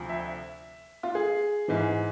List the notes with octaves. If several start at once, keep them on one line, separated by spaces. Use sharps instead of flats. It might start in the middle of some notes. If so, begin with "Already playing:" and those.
Already playing: D2 C3 F3
E5
F4
G#4
G#2 E3